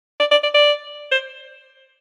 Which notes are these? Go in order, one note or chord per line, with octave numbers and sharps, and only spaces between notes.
D5
D5
D5
D5
C5